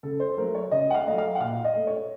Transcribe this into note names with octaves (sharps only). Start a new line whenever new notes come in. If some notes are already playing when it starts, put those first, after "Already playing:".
C#3 A4
C5
F#3 A3 A#4
C#5
C#3 D#5
F#5
F5
F#3 A3 D#5
F5
F#5
A#2 F5
D#5
A3
C#5